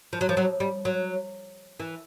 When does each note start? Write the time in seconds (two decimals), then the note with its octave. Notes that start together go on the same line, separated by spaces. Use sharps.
0.13 F3
0.21 F#3
0.29 F3
0.37 F#3
0.60 G3
0.85 F#3
1.80 E3